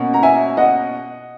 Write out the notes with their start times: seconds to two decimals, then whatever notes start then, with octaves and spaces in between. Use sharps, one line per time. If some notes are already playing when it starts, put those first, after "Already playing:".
Already playing: B2 A#3 C#4
0.14 A#5
0.23 E5 G#5
0.57 D#5 F#5